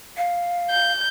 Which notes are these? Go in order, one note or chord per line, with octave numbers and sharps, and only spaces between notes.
F5
G6